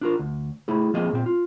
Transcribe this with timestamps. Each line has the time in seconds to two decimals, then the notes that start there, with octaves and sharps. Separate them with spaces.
0.01 D4 F4 A#4
0.19 D2
0.68 A3 E4 G#4
0.94 F3 A#3 C4 G#4 D#5
1.13 A#2 C4
1.26 F4